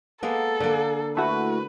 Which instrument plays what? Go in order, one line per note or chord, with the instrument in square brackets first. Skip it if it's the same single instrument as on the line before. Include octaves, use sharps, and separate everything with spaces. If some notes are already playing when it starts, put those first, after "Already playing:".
[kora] G#3 A#3 B3 [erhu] A4
[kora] D3 A#3
[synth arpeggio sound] A3 E4 F#4 [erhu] B4